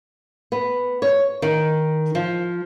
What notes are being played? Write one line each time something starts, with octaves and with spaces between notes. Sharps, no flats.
B3
C#5
D#3
F3